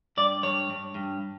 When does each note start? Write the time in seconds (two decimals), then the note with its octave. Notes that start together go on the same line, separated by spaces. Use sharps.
0.17 G2 D5
0.43 G2 C#5
0.70 G2
0.95 G2